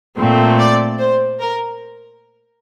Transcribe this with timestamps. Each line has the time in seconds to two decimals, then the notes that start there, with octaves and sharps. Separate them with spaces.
0.18 A#2 A3 C4
0.59 D5
0.99 C5
1.40 A#4